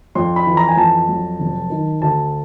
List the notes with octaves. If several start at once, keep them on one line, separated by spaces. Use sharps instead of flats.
F2 C6
B5
E3
A#5
G#5
F2 A5
F#3
F1
D#3
D2 A5